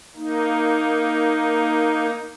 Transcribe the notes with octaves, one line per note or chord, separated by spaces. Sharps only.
A#3 D#4